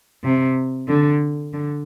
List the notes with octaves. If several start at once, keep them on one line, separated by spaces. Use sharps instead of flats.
C3
D3
D3